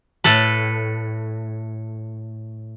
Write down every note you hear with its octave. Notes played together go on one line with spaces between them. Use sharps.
A2 A4 B4